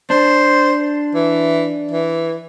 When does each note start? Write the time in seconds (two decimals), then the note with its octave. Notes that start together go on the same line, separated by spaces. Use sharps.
0.10 D4 C5
1.14 E3
1.91 E3